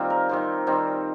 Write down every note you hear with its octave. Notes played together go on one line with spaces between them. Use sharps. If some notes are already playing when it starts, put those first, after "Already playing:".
Already playing: D#3 G3 C4 F4
A#4
D#3 G3 C4
D#3 G3 C4